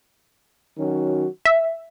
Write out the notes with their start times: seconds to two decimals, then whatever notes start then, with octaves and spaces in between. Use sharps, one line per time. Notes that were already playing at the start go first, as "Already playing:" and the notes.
0.78 D#3 F#3 C#4 F#4
1.45 E5